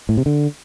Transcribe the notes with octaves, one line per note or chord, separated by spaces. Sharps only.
A2
C3
D3